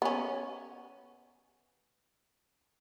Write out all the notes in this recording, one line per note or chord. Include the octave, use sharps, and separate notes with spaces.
B3 C#4